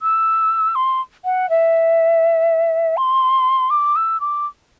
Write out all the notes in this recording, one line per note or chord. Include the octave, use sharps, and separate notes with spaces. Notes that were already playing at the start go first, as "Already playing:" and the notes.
E6
C6
F#5
E5
C6
D6
E6
D6